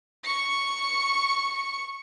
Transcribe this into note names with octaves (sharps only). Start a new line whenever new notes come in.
C#6 C#7